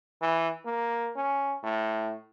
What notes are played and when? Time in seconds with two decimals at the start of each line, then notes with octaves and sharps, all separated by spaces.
0.21 E3
0.65 A#3
1.16 C#4
1.63 A2